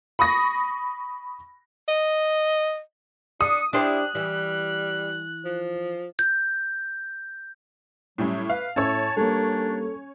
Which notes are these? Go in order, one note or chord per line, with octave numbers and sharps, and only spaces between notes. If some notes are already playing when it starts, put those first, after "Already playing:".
B5 C#6 D#6 A#6
D#5
D4 D#6 C#7
D4 E4 G4 C5 F#6
E3 G3
F3
G6
A2 F#3 G3 C#4
B4 F5
A2 C#4 C#5 E5 A5 E6
G3 A#3 D4 A4